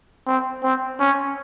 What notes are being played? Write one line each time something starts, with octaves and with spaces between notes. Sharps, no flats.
C4
C4
C#4